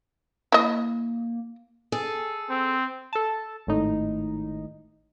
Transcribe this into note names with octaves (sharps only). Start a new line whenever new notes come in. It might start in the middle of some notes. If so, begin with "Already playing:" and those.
A#3 E4 D#5
G#4 A4
C4
A4 A5
G#1 A2 D#4